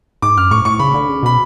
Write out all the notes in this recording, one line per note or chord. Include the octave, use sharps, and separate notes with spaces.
G#2 D6
F#2 F6
A2 C#6
A2 C#6
C#3 B5
D3
C#3
B2 B5